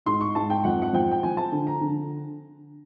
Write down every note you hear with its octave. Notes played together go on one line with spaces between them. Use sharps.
G#2 C6
C#6
G#2 A5
G5
F2 F#5
F#5
F3 G5
G5
F3 G#5
A5
D3
A#5
D3